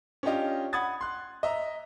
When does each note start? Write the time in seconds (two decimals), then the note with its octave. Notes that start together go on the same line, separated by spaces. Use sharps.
0.23 C#4 D4 F4 G4 D#5
0.73 F#5 B5 D#6 G#6 A6
1.01 C6 F#6
1.43 D#5 E5 A#5